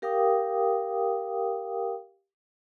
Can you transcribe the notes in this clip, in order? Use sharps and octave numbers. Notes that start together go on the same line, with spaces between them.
G4 A#4 F5 G5 D6 D#6